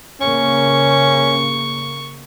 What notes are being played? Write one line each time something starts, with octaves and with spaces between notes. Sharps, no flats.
C#3 A#3 C#4 C#6